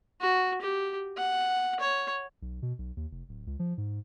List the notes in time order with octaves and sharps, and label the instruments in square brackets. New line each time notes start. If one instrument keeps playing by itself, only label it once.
[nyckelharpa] F#4
G4
F#5
C#5
[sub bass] B1
B2
B1
D#2
F1
D1
C#2
F3
G#2